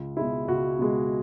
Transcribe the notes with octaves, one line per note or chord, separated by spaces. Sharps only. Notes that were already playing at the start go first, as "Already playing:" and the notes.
Already playing: C#2
B2 G#3 E4
C#2 F#4
B2 G#3